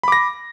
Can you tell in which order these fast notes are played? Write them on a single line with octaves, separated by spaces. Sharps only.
B5 D6 A#6